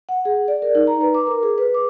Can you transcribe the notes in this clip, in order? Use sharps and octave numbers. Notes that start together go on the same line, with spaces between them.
F#5
G#4
D5
A#4
D#4
A#5
B4
D6
A#4
G#4
B4
D6